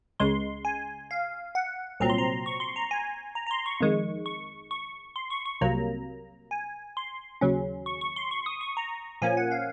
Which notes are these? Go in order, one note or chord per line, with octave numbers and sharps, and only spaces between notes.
C#2 C#3 G#3 C6
G#5
F5
F#5
C2 A#2 F#3 C4 A#5
C6
A#5
C#6
C6
A#5
G#5
A#5
A#5
C6
C#6
F2 D#3 G#3
C#6
C#6
C6
C#6
C#6
C2 C3 F#3 A#3 A#5
G#5
C6
D#2 C#3 F#3 C#4
C#6
C#6
C6
C#6
D#6
C#6
A#5
A#2 F3 A#3 C#4 G#5
F#5
F5